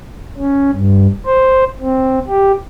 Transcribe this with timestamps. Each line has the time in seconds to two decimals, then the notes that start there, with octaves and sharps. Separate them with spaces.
0.38 C#4
0.72 G2
1.26 C5
1.80 C4
2.28 G4